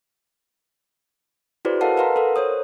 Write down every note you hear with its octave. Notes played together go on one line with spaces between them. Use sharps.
E4 F#4 G#4 B4 C5 D5
A4 A#4 D#5 F5 F#5 A5
A#4 B4 F5 F#5 A#5 C6
A4 A#4
A4 C5 C#5 D#6